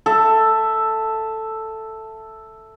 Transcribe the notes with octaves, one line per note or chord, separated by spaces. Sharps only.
A4 E5